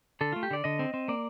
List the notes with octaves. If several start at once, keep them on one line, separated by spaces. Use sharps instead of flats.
D3 A4
A3 F4
G4
D3 D5
D3 D#5
C4
C4
A#3 D5